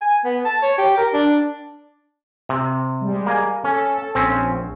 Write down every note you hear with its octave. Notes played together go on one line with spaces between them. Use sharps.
G#5
B3
A5
C#5
G4
A#4
D4
C3
G3 G#3
A#3 G#5
C#4 A4
A#1 C4 C#4